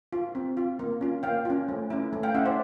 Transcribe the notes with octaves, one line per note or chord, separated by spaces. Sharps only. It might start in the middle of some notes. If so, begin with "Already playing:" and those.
F4
C4
F4
A#3
C#4 F4
A#3 F5 G5
C#4 F4
A3
C#4 E4
A3
F5 G5
C#4 E4 E5 F#5
C5 D5